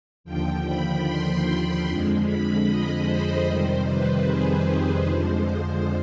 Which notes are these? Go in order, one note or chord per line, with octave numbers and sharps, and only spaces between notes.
D#2 D3 F3 G5
B5
C6
F2 D3 F3 G#3
B5
D#5
C5
F2 C3 D#3 G3 C5
B4
G#4
B4
F2 D3 F3 G#3 C5